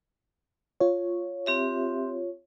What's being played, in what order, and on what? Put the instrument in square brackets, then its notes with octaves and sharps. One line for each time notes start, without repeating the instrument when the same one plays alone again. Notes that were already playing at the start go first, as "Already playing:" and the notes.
[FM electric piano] F4 C#5
[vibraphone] C4 G4 E5